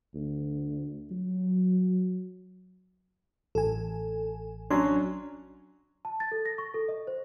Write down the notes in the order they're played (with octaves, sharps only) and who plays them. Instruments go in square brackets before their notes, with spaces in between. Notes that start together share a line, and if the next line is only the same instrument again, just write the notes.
[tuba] D2
F#3
[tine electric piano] A1 [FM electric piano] A4 G#5
[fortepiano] F#3 C#4 [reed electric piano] D4 [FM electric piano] C6
[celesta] A5
A6
A4
A#6
C#6
A4
D#5
C5